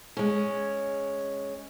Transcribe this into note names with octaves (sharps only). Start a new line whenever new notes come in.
G#3 C#4